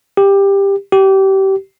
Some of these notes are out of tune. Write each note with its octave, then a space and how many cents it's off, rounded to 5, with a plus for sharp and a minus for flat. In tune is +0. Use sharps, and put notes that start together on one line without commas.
G4 +15
G4 -25